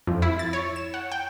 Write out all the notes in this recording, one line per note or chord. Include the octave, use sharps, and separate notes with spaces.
F2
E4
A6
C#5
E7
F#5
G5